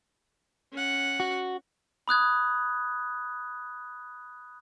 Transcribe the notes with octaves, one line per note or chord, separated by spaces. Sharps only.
C#4 F#5
F#4
B5 D#6 F#6 G#6